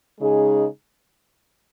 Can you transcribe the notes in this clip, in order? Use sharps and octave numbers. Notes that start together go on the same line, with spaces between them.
C#3 G#3 D#4 G#4